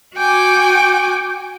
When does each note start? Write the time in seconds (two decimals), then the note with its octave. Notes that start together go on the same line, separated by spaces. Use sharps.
0.16 F#4 G5 G#5 D6